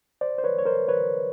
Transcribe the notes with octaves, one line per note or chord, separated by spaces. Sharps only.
C5 D5
C5
B4 C#5
C#5
A#4 C5
B4 C#5